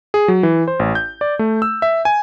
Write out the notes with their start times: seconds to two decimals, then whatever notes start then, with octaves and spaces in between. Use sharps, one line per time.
0.14 G#4
0.28 F#3
0.43 E3
0.68 C5
0.79 A1
0.95 G6
1.21 D5
1.39 A3
1.62 E6
1.82 E5
2.05 G#5